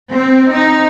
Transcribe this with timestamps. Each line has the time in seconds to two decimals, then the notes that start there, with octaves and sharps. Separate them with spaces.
0.11 C4
0.54 D#4